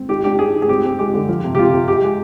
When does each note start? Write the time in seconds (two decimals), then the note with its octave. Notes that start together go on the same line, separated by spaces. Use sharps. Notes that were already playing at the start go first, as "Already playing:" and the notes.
Already playing: C4
0.09 D#3 G4
0.24 D4 G4
0.38 D4 G#4
0.54 D#3
0.62 G#4
0.68 C4 G4
0.83 C4
0.99 G#3 G4
1.14 D3
1.29 F3
1.44 C3
1.55 G4
1.59 C3 F4
1.74 C3
1.88 G#3 G4
2.04 G#3